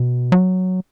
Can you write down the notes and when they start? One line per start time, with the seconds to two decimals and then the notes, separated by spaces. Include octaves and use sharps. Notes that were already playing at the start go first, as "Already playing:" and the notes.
Already playing: B2
0.32 F#3